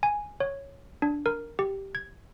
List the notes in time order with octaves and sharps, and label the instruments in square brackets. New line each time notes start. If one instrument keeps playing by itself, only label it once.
[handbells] G#5
C#5
D4
A#4
G4
G#6